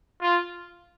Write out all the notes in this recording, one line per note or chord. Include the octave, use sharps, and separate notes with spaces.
F4